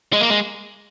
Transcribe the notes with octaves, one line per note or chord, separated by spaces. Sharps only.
G#3
A#3
G#3